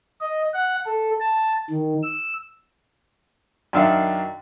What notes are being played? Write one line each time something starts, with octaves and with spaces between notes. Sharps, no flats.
D#5
F#5
A4
A5
D#3
E6
F#2 D#3 D4 E5 F5